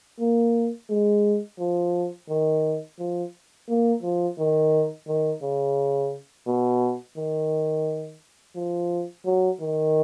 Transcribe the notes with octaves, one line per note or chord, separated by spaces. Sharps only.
A#3
G#3
F3
D#3
F3
A#3
F3
D#3
D#3
C#3
B2
D#3
F3
F#3
D#3